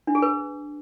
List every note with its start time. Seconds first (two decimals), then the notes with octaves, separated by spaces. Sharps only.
0.07 D4
0.15 G#4
0.22 B4